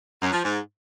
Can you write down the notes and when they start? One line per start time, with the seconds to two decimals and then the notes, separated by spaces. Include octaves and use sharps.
0.21 F#2
0.33 F3
0.44 G#2